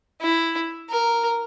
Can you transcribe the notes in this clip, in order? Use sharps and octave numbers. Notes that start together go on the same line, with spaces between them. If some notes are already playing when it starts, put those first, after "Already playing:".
E4
A#4